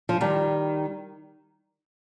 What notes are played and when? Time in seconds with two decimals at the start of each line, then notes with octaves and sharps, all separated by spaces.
0.09 F3
0.21 D#3 G3